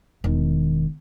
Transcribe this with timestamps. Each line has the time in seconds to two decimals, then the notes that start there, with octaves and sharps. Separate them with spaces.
0.24 E1 D#3